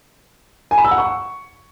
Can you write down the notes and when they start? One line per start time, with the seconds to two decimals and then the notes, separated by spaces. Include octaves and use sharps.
0.71 G#5
0.78 B5
0.85 E6
0.91 F#5
0.98 C#6